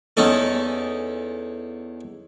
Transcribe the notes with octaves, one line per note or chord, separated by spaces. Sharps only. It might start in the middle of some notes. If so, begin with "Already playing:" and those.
E2 C#4 D#4 A4